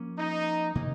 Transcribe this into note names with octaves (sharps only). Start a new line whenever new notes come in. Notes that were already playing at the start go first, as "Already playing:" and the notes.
Already playing: F3 A#3 C#4
D#4
C3 D#3 A#3